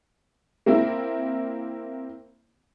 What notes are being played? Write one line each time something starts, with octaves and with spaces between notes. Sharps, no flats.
A#3 C4 E4